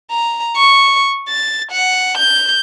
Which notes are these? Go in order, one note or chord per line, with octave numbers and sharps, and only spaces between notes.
A#5
C#6
A6
F#5
G6